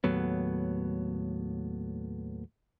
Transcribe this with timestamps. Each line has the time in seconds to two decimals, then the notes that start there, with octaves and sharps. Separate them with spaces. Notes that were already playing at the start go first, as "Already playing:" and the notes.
0.04 D#2 A2 F#3 B3